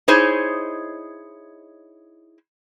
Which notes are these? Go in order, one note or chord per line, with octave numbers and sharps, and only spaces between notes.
D#4 E4 G#4 C5 C#5 D#5